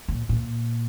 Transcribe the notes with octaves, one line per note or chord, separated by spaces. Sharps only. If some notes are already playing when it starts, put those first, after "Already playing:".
A#2
A#2